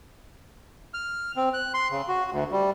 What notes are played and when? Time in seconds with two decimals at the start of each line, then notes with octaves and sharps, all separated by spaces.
0.94 F6
1.37 C4
1.54 F#6
1.74 C6
1.91 C#3
2.08 F#4
2.31 D2
2.52 G3